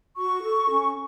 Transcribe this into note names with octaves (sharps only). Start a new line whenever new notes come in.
F#4 C#6
A4
C#4